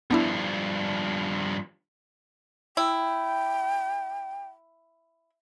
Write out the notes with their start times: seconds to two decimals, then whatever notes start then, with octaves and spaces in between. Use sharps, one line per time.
0.11 G2 F3 B3 D4 E4
2.77 E4 G5